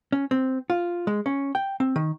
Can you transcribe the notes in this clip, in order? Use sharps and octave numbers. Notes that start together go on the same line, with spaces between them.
C#4
C4
F4
G#3
C#4
G5
C4
D#3